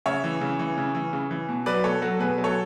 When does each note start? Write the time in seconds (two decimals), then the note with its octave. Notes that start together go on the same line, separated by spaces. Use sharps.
0.06 C#3 C#5 E5
0.24 E3
0.41 C#3
0.59 E3
0.78 C#3
0.95 E3
1.13 C#3
1.31 E3
1.49 B2
1.66 F#3 B4 D5
1.84 B2 A4 C#5
2.02 F#3 F#4 A4
2.19 B2 G#4 B4
2.38 F#3
2.44 A4 C#5